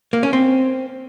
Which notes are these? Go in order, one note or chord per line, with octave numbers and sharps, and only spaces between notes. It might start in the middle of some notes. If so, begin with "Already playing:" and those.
A#3
C#4
C4